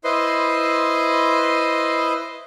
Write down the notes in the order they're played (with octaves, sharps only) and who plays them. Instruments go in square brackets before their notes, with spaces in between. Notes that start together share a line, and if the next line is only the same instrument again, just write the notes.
[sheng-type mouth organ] E4 B4 C5 D#5 C6